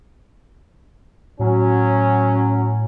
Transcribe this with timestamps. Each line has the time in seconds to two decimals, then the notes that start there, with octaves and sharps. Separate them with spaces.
1.39 A2 F#3 C#4